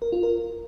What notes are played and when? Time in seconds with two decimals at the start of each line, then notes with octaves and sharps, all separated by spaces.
0.02 A#4
0.12 F4
0.23 A#4